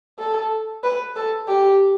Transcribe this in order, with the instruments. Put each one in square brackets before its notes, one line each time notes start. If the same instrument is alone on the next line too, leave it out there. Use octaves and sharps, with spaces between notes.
[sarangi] A4
B4
A4
G4